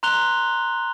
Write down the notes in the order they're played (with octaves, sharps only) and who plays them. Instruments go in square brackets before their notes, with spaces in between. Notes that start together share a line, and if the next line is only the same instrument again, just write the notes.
[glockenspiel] A#5 C6 F#6 F7 G7